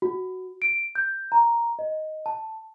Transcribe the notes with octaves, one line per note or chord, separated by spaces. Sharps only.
F#4
D7
G6
A#5
D#5
A5